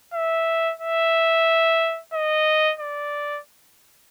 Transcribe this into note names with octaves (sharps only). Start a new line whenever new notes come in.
E5
E5
D#5
D5